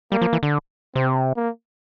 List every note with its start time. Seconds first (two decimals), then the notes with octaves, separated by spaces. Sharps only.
0.12 G3 A#3
0.21 F3
0.33 E3
0.43 D3
0.95 C3 C4
1.37 A#3